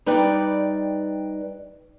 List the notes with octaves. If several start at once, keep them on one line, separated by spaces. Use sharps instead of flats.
G3 D#4 B4 D5 G5